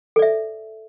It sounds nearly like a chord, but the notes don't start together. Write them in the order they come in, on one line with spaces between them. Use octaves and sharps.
A4 D5 E5